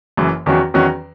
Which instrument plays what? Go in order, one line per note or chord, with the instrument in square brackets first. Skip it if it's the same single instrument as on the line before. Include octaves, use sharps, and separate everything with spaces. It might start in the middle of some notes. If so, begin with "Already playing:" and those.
[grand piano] F#1 F#2 E3
E2 D#3 F#3 C#4 F#4
E2 D#3 F#3 C#4 F#4